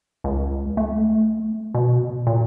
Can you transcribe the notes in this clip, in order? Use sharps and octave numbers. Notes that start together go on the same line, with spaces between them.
C#2
A3
B2
A#2